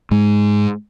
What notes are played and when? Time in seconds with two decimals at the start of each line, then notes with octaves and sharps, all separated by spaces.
0.11 G#2 G#3